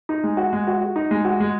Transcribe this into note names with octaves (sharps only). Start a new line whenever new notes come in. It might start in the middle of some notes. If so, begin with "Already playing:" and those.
D#4
G#3
F#4
G#3
F#4
F#4
D#4
G#3
F#4
G#3